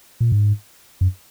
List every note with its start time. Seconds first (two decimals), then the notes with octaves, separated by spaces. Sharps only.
0.20 A#2
0.32 G#2
1.01 F#2